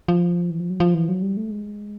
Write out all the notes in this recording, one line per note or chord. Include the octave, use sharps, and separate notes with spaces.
F3
E3
F3
F#3
F3
E3
F#3
G3
A3
G#3